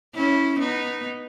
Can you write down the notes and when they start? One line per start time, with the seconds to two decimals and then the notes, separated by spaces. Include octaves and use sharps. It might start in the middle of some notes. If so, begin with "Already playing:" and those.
0.15 C#4 E4
0.59 B3 D#4